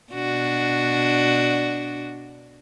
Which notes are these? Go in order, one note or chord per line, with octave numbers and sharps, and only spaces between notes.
B2 D4 F#4